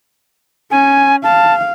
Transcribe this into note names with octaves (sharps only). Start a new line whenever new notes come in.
C#4 G#5
F5 A5